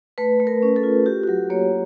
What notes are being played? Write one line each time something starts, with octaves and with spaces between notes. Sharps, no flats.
A3 B4
A3
A#4
C#4
A4
F4
F#4 G4
F#4
F#3 G4
A#3 C#5